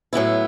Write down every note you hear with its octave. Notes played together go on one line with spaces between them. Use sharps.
A2 F#3 B3 E4